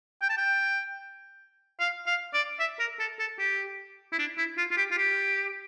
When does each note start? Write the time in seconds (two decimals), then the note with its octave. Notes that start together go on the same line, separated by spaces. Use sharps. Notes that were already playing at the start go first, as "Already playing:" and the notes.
0.22 G5
0.30 A5
0.38 G5
1.80 F5
2.07 F5
2.34 D5
2.60 E5
2.79 A#4
3.00 A4
3.19 A4
3.39 G4
4.13 E4
4.19 D4
4.38 E4
4.58 F4
4.71 F4
4.77 G4
4.91 F4
4.98 G4